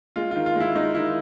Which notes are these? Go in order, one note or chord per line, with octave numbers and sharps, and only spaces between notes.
G#3 F4
D#3 F4
F4
G#3 E4
G#3 D#4
D#3 E4